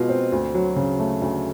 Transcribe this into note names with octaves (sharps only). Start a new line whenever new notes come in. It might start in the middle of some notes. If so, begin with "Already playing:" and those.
Already playing: B2 G#3 F4
C4
D2
F#3
C#3
A3
D2